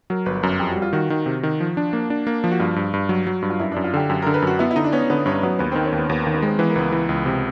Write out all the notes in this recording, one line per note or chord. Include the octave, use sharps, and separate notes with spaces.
F#3 A#4
G1 B4
F#2 A#4
F2 G4
G3 F#4
F4
D#3 F#4
D#3
C3
D#3
F3
D4
A#3
D4
A#3
F3
F#4
G2 F4
G2
G2
F#3
F#3
G2
F4
F#2 E4
F#2 D4
F4
D3 G4
F#2 G4
D3 A#4
B4
F#2 F#4
B3 E4
E4
D3 D#4
D4
B3 C#4
D3 B3
G2 C#4
F#3 B3
D#2 B3
D#3 C4
C#4
D#2 B3
D#2 B3
D#3 A#3
B3
G#3 C4
E3 B3
A#3
C#2 B3
E3
C#2
C3